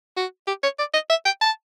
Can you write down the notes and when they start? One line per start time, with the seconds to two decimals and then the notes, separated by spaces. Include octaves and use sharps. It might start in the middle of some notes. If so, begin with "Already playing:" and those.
0.16 F#4
0.47 G4
0.63 C#5
0.78 D5
0.94 D#5
1.10 E5
1.25 G5
1.41 A5